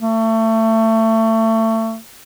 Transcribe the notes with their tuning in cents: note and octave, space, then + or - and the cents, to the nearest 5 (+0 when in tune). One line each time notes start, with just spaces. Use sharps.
A3 +25